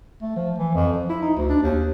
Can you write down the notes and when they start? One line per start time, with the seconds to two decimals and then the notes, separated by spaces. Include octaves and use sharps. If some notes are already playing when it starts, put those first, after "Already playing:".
0.22 A3
0.36 F3
0.58 E3
0.74 F2
0.93 F3
1.09 E4
1.22 D#4
1.37 D2
1.49 D4
1.62 D#2